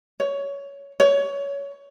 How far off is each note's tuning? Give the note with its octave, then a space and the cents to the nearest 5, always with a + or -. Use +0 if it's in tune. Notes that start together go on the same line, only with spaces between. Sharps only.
C#5 +15
C#5 +20